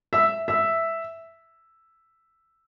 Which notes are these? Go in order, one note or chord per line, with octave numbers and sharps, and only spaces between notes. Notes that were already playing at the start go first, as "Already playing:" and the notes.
E5
E5